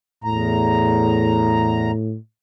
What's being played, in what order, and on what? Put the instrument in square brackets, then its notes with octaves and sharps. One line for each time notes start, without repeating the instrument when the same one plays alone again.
[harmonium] E2 A#5 [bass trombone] A2